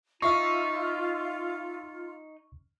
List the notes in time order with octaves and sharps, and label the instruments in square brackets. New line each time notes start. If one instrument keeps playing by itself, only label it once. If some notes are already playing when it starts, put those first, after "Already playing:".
[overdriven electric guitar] D#4 [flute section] F4 [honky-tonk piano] E5 F5 C7 [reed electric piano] C#6